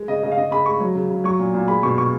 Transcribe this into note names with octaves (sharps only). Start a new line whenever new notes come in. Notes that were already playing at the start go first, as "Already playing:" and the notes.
Already playing: G#3
C#3 D#5
C#3 D#5
F5
C#3 D#5
C#3 B5
G#3 C#6
F#3
C#3
C#3
F#3 C#6
A#2
A#2
G#3 B5
B2 C#6
B2 C#6